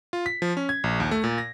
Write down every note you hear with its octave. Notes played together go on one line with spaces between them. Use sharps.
F4
B6
F3
C#4
G#6
A#1
D#2
A3
A#2
A#6